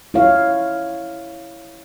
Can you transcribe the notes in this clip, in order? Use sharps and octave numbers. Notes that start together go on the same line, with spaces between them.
E4 F4 C#5 F5